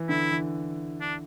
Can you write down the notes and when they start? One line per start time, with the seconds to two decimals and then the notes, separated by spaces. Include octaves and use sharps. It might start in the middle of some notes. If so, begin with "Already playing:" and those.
Already playing: E3
0.09 D3 E4
0.32 E3
1.01 D4